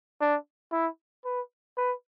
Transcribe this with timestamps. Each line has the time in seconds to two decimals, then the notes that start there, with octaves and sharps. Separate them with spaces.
0.21 D4
0.72 E4
1.25 B4
1.77 B4